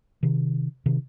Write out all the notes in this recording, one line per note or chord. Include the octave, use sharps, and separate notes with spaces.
C3 D#3
C3 D#3